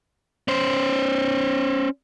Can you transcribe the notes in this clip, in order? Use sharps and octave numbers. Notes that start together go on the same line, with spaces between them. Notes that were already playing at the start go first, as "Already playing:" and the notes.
C#4 C5